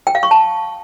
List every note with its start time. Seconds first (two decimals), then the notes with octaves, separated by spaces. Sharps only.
0.07 G5
0.15 F5
0.23 C#6
0.31 A5